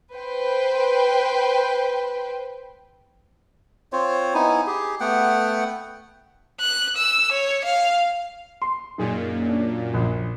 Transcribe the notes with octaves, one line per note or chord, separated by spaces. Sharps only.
B4 C5 G5
C4 F4 C5 C#5
B3 D#4 E4 G#5
G4 G#4
A3 B3 F#5 G5
F#6
E6
C#5
F5
C6
F#2 A#2 D#4 G#4
D4
A#1